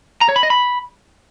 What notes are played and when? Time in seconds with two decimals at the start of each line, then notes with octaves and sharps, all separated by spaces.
0.21 A#5
0.29 C#5
0.36 B5
0.43 D#5
0.50 B5